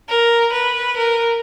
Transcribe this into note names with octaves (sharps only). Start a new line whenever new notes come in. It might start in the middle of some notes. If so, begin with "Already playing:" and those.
A#4
B4
A#4